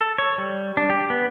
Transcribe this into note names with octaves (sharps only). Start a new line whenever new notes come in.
A4
C#5
G3
D4
G4
B3